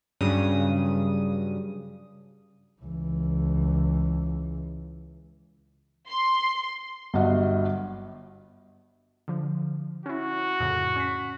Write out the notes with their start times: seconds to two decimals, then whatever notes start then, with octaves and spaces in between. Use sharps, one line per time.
0.21 G2 C#3 F#3 D#6
2.82 C#2 E3
6.10 C6
7.14 G1 G2 F#3 D#5 F#5
9.28 D3 F3
10.06 C#4 E4 F#4
10.60 F2 A2 C#3
10.96 C#4 B6